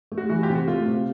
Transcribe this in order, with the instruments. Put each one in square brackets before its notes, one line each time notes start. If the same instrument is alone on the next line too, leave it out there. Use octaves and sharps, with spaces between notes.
[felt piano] A3
[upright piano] F#4
[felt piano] E3 [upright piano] F#4
[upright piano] F4 G4
[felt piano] C3
[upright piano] F#4
[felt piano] A3 [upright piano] F4
[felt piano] C3